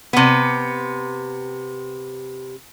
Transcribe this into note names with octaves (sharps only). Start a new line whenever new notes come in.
C3 B3